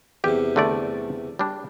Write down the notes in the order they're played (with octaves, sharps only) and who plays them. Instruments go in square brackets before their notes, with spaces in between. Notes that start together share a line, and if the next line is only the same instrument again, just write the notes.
[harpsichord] E2 C3 [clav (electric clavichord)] G4
[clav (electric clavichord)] D3 A3 D5
G3 D4